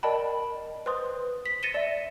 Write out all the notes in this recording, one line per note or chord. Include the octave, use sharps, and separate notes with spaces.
A#4 D5 D#5 G5 A5 B5
B4 C5 C6 D#6
B6
A6 A#6 C#7 D#7 E7 G7
D5 E5